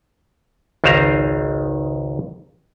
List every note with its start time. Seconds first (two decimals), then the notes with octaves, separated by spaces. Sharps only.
0.84 G#1 C#2 D#3 C5 F5 A#5